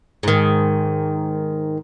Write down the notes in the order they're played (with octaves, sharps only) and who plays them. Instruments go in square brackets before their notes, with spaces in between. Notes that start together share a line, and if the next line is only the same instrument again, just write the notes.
[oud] G#2 D#3